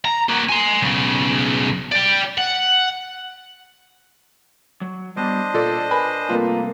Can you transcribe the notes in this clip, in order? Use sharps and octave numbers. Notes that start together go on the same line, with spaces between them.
A#5
A#3 F#4
G#5 C6
B1 C#3
D5 G5
F#5
F#3
F#3 G3 B3 D4 C5 D#5
A#2 F4 A4 D5
A#4 B4 G#5 B5
G2 C3 A3 A#3 F4 B4